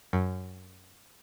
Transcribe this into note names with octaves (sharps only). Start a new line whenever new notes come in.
F#2